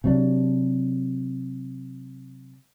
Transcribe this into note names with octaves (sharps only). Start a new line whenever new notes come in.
C3 F#3 D4